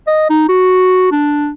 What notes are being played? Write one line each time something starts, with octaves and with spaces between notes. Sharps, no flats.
D#5
D#4
F#4
D4